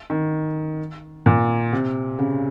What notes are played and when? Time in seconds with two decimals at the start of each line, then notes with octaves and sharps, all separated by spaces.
0.10 D#3
1.26 A#2
1.73 C3
2.19 C#3